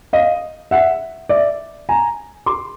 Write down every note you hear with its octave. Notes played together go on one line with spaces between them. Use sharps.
D#5 F5
E5 F#5
D5 E5
G#5 A#5
C6 D6